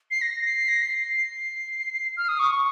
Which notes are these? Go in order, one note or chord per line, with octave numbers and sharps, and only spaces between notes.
C7
A#6
C7
A#6
C7
C7
F6
D#6
C#6
C#6